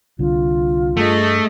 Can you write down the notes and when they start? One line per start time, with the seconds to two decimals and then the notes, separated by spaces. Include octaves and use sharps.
0.19 C2 D3 F4
0.97 G2 A3 G#4 D#5